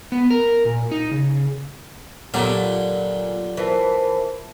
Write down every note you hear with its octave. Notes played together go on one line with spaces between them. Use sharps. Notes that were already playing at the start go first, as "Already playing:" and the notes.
B3
A#4
A#2
D#4
C#3
A#2 D3 F#3 G3
E3 A#4 C5 A5